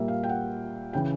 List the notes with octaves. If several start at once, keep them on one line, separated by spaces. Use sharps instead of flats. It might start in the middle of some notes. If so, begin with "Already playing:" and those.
Already playing: A#2 G3 A#3 E5
F5
G5
F#5
C#3 E3 G5